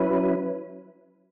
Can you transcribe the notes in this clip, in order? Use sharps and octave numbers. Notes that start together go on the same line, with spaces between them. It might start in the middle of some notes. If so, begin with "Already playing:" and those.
Already playing: F#3 C#4 E4 B4